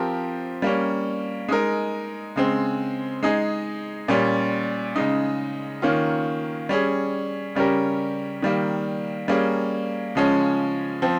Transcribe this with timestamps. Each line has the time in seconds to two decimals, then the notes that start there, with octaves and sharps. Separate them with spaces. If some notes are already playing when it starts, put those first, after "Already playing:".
Already playing: F3 C4 G4 A#4
0.62 G3 A#3 C#4
1.48 G#3 D#4 A#4
2.36 C#3 G#3 C4
3.23 G#3 D#4 G#4
4.08 A#2 G3 C#4
4.96 C#3 G#3 D#4
5.82 D#3 A#3 C#4 F4
6.69 G3 C#4 G#4
7.55 C#3 G3 C#4 G4 A#4
8.42 D#3 G3 A#3
9.28 G3 A#3 C#4 G#4
10.15 C#3 F3 G#3 C#4
11.02 F3 C4